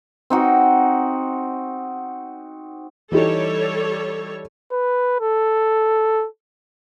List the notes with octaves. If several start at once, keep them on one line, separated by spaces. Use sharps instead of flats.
C4 D#4 F#4
E3 G3 D#4 G4 A4 C#5
B4
A4